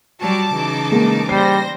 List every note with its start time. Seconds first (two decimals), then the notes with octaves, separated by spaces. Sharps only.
0.21 F#3 G3 F#4 A5 D6
0.54 C#3 E3 D#4
0.92 G#3 A#3
1.29 G3 C5 A#6 C7